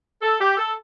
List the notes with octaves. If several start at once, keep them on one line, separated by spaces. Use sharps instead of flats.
A4
G4
A4